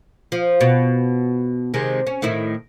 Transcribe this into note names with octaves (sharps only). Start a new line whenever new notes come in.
F3
B2
C3 D#3 G#3
C#4
A2 D#3 E4